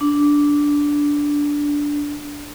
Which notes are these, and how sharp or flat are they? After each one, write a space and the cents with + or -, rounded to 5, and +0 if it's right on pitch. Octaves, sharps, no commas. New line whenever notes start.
D4 -10